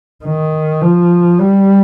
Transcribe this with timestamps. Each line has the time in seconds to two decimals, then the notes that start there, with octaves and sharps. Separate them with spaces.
0.24 D#3
0.82 F3
1.40 G3